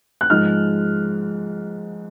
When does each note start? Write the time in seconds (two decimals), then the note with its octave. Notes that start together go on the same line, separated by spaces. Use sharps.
0.21 F#6
0.30 G#2 F3 G#3 F6